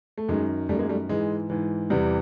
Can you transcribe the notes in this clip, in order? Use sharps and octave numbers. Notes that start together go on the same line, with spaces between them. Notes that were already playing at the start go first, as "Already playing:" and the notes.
A3
F#2 D#3 G#3
F#2 D#3 G3 A3
G#3 A#3
G3 A3
G#2 E3 G#3
G#2 E3
E2 C3 E3 G3